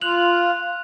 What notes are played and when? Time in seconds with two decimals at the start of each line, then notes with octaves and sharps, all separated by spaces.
0.02 F4 F#6 F7 F#7